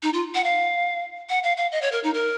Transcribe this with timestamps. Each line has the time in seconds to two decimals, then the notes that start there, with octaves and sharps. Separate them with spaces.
0.03 D#4
0.13 F4
0.35 F#5
0.44 F5
1.29 F#5
1.43 F5
1.57 F5
1.72 D#5
1.82 C#5
1.92 A#4
2.03 D#4
2.14 A#4